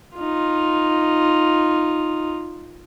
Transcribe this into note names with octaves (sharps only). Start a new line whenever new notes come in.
D#4 F4